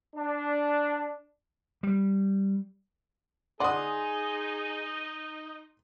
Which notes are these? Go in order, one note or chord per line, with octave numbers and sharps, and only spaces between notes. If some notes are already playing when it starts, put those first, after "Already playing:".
D4
G3
D#4 G#4 D5 F#5 C6 D#6